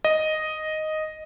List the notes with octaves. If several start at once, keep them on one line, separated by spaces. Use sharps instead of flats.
D#5